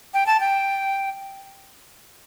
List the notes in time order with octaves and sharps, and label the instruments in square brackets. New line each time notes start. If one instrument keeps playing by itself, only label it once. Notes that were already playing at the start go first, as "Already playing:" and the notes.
[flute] G5
A5
G5